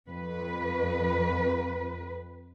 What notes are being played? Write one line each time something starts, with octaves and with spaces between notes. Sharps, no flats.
F2 B4